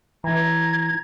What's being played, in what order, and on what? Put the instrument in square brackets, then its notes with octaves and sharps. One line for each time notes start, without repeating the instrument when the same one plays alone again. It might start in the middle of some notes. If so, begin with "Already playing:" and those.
[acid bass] E3 [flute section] A#5 G#6